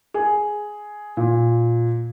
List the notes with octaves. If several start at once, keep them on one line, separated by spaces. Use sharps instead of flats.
G#4
A#2